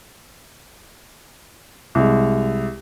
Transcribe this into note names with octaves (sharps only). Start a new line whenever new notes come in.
C2 G#3